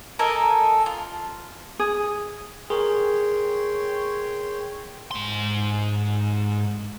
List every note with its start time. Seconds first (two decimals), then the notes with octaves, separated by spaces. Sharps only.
0.19 A4 A#4 D#5 G#5
0.86 F4
1.79 G#4
2.70 G#4 A#4 C#5 G5 C6
5.11 G#2 C6